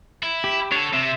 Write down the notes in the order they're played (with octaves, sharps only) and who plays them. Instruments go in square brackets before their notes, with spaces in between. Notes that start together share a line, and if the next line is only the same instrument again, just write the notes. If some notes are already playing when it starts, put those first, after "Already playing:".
[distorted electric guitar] E4
[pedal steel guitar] G4
[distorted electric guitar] D4 A4 [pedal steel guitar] C#5
[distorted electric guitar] C3 [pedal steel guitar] E5